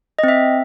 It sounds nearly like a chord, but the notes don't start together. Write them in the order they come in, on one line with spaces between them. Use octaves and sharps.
D#5 C4 E5